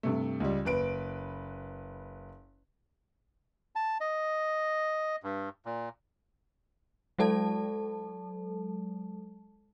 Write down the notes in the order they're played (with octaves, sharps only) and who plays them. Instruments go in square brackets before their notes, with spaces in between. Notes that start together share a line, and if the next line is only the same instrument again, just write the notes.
[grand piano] G2 C3 A3
C#2 G3
F#1 B4 D7
[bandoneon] A5
D#5
G2
A#2
[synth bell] F#3 G#3 A4 A5